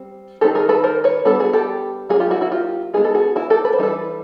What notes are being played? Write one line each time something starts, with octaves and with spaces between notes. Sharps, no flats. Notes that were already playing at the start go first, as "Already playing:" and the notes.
Already playing: G3 C4
D#3 G#3 C4 D#4 G4 A4
G#4 A#4
A4 B4
A#4 C5
B4 C#5
G3 B3 D4 A4 B4
F#4 G#4
G4 A4
F#3 A#3 C#4 F#4 G#4
F4 G4
E4 F#4
E4 F#4
F4 G4
G#3 B3 D#4 G#4
A4
F#4 G#4
E4 F#4
G4 A4
B4
C5
E3 G3 C4 D#4 A4 B4